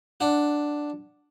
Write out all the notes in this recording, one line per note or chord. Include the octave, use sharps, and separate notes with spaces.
D4 F#5